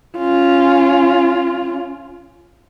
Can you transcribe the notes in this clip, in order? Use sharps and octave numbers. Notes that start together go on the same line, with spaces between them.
C#4 F4